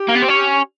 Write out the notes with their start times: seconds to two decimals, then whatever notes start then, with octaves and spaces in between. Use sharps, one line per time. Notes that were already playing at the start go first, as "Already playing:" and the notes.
Already playing: G4
0.08 A#3
0.15 B3
0.22 C4
0.28 C#4